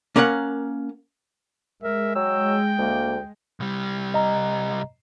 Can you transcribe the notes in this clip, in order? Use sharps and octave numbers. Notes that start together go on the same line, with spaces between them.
A#3 C#4 A#4 F5 F#5
G#3 A#4 E5
F#3 G5 E6
D2 A#3
C2 G3
D#5 A#5